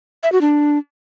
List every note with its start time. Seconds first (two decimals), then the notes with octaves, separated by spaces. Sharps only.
0.23 E5
0.32 F#4
0.41 D4